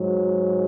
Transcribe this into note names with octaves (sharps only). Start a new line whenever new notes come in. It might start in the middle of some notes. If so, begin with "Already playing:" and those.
Already playing: G#2 F#3